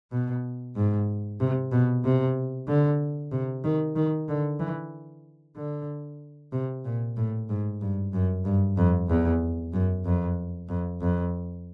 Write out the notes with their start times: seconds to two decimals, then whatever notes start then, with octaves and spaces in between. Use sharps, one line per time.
0.12 B2
0.76 G#2
1.40 C3
1.72 B2
2.04 C3
2.68 D3
3.32 C3
3.64 D#3
3.96 D#3
4.29 D3
4.60 E3
5.56 D3
6.52 C3
6.85 A#2
7.17 A2
7.49 G#2
7.81 G2
8.13 F#2
8.45 G2
8.77 F2
9.08 E2
9.73 F#2
10.05 F2
10.69 F2
11.01 F2